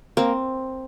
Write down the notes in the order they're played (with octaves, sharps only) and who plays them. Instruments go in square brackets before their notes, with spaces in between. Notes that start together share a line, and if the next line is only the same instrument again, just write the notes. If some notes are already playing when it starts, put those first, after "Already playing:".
[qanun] A#3 C4